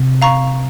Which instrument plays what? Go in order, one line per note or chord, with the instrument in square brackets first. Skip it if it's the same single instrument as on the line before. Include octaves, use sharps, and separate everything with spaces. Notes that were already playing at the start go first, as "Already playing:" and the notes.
Already playing: [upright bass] C3
[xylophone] F5 A#5 C#6